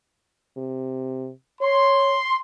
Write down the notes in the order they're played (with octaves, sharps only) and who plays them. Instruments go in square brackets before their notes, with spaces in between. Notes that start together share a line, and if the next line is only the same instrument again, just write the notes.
[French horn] C3
[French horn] C#5 [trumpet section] C6